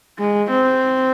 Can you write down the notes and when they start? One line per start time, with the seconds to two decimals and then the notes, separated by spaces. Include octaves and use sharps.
0.18 G#3
0.50 C4